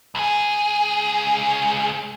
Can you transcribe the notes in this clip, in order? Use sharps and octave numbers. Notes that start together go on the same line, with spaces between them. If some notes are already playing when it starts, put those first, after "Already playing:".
C#2 G#4